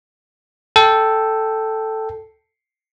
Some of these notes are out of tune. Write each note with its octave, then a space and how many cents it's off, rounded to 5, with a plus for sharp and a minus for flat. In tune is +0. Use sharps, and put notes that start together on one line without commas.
A4 +0 G5 +0